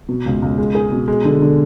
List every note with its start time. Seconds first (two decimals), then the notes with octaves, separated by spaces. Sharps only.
0.09 B2
0.26 C#2
0.42 C#2
0.58 G#3
0.75 G#4
0.92 B2
1.08 G#3
1.25 D3
1.42 D3